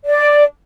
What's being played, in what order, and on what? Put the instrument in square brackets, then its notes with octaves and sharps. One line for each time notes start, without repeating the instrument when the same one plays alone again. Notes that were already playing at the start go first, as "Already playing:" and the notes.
[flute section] D5